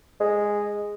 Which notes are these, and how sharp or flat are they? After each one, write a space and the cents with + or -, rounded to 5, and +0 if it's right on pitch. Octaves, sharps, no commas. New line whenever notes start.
G#3 -5